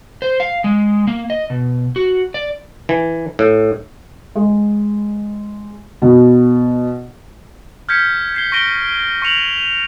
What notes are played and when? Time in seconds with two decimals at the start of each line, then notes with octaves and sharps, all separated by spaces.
0.22 C5
0.40 F5
0.64 G#3
1.07 A#3
1.30 D#5
1.50 B2
1.96 F#4
2.34 D5
2.89 E3
3.39 A2
4.35 G#3
6.02 B2
7.89 F6 G6 G#6 B6 C#7
8.35 G#6 C7 G7
8.52 C#6 A#6 D7 G7
9.22 C#6 C#7 F7 F#7